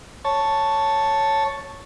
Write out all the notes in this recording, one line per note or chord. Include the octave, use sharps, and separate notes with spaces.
C#5 A5